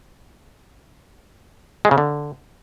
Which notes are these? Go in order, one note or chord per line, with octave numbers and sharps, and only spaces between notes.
G#3
C#3
D3